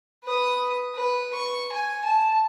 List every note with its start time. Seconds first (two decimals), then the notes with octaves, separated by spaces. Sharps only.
0.24 B4 D#6
0.96 B4
1.33 C#6
1.72 G#5
2.05 A5